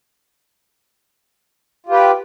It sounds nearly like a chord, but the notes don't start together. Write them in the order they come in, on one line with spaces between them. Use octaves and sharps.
F4 G4 B4